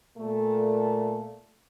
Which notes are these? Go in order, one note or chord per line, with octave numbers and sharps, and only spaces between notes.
A#2 A3